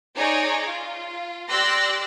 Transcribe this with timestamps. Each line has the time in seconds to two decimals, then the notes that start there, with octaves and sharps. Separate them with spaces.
0.16 D#4 G#4 C#5 D5 G#5 A#5
0.68 F4
1.50 G4 D5 C6 E6 F#6 A#6